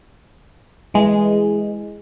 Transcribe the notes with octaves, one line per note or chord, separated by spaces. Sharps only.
E3 G#3